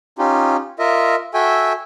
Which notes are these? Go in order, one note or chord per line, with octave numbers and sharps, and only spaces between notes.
C#4 D#4 F4 G4
F4 A#4 D#5 E5
F#4 A4 E5 G5 G#5